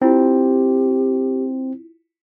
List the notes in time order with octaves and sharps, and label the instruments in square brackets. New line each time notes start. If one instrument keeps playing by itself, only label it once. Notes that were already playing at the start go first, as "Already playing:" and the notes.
[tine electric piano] C4 [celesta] E4 F4 [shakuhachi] G4